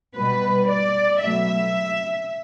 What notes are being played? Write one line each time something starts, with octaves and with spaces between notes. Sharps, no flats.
B2 G3 B4
D5
B2 F#3 A3 E5